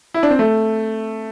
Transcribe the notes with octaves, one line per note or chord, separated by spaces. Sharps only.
E4
D4
C4
A3